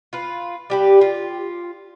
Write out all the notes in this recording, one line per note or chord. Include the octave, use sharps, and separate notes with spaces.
F4 B4
G3 G4 B4
F4